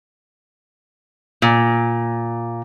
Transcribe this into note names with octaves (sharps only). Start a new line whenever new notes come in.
A#2